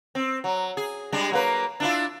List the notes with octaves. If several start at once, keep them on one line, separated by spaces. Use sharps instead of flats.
C4
F#3
G#4
G3 G#3 D4
F#3 A#3 B4
D4 E4 F4